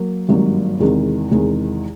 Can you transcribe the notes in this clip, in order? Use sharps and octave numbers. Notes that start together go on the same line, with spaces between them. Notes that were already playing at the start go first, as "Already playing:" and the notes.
Already playing: F#3 A#3
G#1 G2 D#3 F#3 A#3
E2 C3 D#3 G#3
E2 C3 D#3 G#3